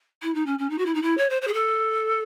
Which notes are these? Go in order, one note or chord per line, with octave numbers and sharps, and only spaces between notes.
E4
D#4
C#4
C#4
D#4
F#4
E4
D#4
E4
C#5
C5
C5
G#4
A4